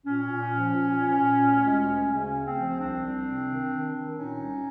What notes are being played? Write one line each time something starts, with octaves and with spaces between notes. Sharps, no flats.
A#2 C#4
A#2
F3
A#2
A#2
A#2
D2
G#3
D2
C#3 C#4
D2
C4
F3
C2 C4 D4
C2
C3
D#3
D#3
D#3
A#2 C#4 D#4
C2